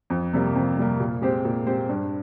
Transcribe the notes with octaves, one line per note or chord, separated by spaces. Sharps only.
F2
C3 G3 A#3
F2
C3 G3 A#3
A#2
G#3 C4 G4 C5
A#2
G#3 C4 G4 C5
G2